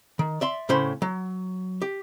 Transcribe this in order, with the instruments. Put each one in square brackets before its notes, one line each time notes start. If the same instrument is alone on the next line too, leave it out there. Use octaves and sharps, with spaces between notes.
[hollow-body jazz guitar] D#3
D5 E5 C6
A2 C#3 C#4 C5 B5 C6
F#3
G4